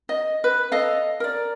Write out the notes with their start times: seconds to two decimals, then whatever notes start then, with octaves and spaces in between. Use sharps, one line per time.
0.09 D#5
0.44 B4
0.72 A4 D#5 F5
1.20 A#4 D5